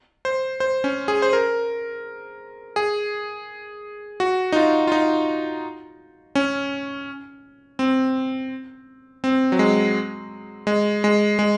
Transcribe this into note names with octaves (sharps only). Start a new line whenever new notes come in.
C5
C5
C#4
G#4
C5
A#4
G#4
F#4
D#4
F4
F4
D#4
C#4
C4
C4
F#3
G#3
G#3
G#3
G#3